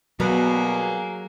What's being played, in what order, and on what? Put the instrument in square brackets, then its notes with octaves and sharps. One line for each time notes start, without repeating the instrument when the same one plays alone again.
[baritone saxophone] B2 [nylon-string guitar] F#3 [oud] G3 B3 A#4 [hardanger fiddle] A#3 G#4